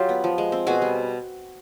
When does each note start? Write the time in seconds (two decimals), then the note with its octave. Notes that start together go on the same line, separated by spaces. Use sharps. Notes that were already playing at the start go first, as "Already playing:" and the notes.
Already playing: F#3 F4 G4
0.09 B3
0.24 F3
0.38 G#3
0.52 C4
0.67 B2 F#4 G#4
0.82 G3